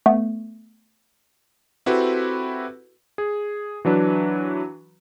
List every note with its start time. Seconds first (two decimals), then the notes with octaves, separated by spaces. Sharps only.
0.06 A3 B3
1.86 C4 E4 F#4 G4 A4 B4
3.18 G#4
3.85 E3 F#3 D4 B4